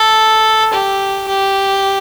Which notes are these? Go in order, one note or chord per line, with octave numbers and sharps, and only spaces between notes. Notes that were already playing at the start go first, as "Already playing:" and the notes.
Already playing: A4
G4
G4